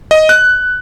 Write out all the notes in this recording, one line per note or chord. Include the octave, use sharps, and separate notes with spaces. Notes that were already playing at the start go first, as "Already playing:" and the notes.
D#5
F#6